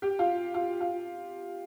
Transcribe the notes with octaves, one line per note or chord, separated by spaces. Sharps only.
G4
F4
F4
F4